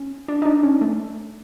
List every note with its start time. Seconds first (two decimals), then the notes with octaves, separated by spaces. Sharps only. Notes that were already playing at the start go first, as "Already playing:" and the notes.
Already playing: C#4
0.28 D4
0.42 D#4
0.46 D4
0.63 C#4
0.81 A3